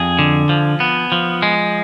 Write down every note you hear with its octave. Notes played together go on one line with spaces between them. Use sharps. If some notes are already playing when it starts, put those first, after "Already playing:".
Already playing: F2 G#4
D3
F3
B3
F3
G#3